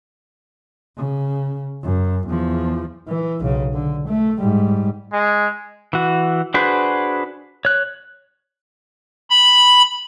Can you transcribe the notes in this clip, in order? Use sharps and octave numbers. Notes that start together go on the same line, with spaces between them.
C#3
F#2
E2 F3
E3
B1 C#3
D3
A3
G#2 G3
G#3
E3 F#4
D4 F#4 G#4 B4 C5
C#5 F#6
B5